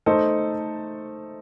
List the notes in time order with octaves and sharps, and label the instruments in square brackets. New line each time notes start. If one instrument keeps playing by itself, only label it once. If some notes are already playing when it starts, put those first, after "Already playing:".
[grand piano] A3 D#4 A4 C5